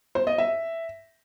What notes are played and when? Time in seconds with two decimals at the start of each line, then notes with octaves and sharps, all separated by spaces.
0.15 C5
0.27 D#5
0.38 E5